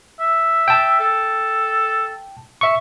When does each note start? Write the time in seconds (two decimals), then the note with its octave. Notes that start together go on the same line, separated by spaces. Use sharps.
0.20 E5
0.68 G5 A5
1.00 A4
2.61 E5 C#6